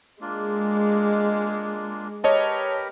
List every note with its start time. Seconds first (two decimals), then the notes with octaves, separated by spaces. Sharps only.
0.21 G#3 A#3 D4 F4
2.24 G4 A#4 B4 C#5 D#5 A5